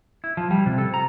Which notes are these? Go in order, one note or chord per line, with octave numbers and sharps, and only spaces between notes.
E4
F3
G3
C3
A4
A#5